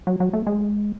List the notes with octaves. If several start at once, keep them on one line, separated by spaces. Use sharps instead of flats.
F#3
F#3
A3
G#3